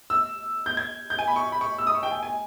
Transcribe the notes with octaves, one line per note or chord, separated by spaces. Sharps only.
E6
G6
G#6
G6
G#5
B5
C#6
B5
C#6
E6
D#6
C#6
G5
G#5
G#5